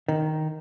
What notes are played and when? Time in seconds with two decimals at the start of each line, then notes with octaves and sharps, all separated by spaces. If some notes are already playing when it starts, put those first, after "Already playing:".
0.08 D#3